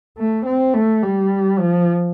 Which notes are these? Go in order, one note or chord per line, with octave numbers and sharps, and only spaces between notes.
A3
C4
A3
G3
F3